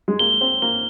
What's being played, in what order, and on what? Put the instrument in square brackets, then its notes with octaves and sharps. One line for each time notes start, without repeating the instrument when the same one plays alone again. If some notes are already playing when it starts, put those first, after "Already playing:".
[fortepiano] G#3
[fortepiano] A#3 [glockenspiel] G7
[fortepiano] C4
[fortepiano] A#3 [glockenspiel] G7